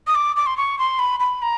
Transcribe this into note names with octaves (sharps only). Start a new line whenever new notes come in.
D#6
D6
D6
C6
C#6
C6
B5
B5
A#5